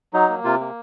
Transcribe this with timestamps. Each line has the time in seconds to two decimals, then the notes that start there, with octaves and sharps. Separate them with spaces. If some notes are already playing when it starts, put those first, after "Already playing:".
0.14 F#3 D#4
0.29 A#3
0.44 C3 F4
0.60 A#3